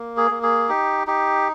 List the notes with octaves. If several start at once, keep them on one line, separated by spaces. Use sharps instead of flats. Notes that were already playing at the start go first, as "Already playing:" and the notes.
Already playing: A#3
G#4
A#3
G#4
D#4 G4
D#4 G4